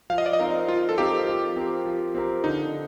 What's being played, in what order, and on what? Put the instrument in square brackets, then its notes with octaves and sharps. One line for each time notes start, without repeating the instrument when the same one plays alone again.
[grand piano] F3 [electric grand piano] F5
[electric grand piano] D#5
D5
D#5
[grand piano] C4 D#4 A#4 F5
[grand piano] F3 [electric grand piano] F4
[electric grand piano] A4
[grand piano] C4 D#4 A#4 F5 [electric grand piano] G4
[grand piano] F3
C4 G4 A#4
F3
C4 G4 A#4
[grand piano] D3 [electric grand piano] D#4